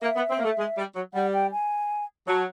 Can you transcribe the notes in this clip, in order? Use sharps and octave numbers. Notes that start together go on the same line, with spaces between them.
A#3 E5
B3
C4
A#3
A3
G#3
G3
F#3
G3 F#5
G5
G#5
F#3 A5